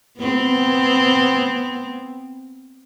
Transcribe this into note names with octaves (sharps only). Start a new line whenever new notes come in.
B3 C4